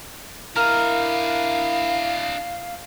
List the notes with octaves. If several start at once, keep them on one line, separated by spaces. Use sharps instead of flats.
D4 E4 A#4 D#5 F5